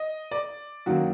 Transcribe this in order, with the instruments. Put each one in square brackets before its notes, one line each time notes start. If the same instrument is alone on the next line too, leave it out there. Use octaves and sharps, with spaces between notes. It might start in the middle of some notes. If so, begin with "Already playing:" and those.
Already playing: [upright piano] D#5
D5
F#2 D#3 F#3 A#3 F#4